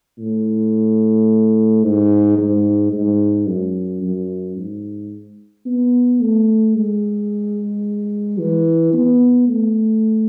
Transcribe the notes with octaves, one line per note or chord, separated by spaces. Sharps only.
A2
G#2
G#2
G#2
F#2
F#2
G#2
B3
A3
G#3
E3
B3
A3